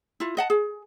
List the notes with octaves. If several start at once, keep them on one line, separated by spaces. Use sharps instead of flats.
E4 F4
D#5 F#5 A5
G#4